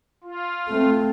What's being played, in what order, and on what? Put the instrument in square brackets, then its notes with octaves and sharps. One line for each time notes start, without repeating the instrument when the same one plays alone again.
[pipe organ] F4
[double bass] A3 C4